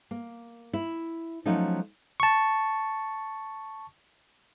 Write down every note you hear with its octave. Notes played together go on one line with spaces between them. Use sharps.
A#3
E4
F3 F#3 A3 C#4 D#4
A5 C#6